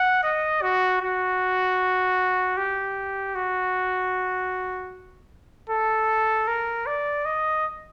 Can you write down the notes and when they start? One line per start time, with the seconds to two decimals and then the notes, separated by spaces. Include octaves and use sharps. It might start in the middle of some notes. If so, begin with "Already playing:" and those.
Already playing: F#5
0.24 D#5
0.62 F#4
1.01 F#4
2.57 G4
3.35 F#4
5.70 A4
6.48 A#4
6.86 D5
7.25 D#5